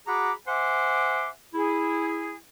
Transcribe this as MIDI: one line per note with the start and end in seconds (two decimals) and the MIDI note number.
0.07 0.32 66
0.07 0.32 68
0.07 0.32 78
0.07 0.32 82
0.07 0.32 83
0.07 0.32 86
0.47 1.29 72
0.47 1.29 76
0.47 1.29 78
0.47 1.29 80
0.47 1.29 84
0.47 1.29 86
1.54 2.35 64
1.54 2.35 68